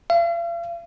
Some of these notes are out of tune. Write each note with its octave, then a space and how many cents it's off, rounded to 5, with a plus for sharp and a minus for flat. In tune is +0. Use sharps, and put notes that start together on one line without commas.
F5 -45